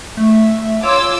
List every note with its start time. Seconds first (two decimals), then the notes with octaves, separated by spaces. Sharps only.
0.17 A3 E5
0.83 F4 C#5 D6 E6